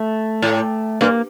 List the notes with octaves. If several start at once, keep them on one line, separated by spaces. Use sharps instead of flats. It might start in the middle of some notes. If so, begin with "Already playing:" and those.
Already playing: A3
A2
G2 A#3